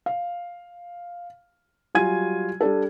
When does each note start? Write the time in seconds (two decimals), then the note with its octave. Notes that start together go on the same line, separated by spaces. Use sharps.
0.06 F5
1.95 F#3 G3 F4 G#5 G#6 D#7
2.61 G3 D4 A4